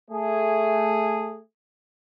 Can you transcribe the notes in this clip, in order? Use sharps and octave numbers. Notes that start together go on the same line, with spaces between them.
A3 G#4